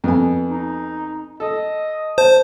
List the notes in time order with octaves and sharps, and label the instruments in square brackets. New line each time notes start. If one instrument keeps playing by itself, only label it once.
[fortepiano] F2 B3 G#5
[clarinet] D#4
[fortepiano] A4 [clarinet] D#5
[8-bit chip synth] C5 [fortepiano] A5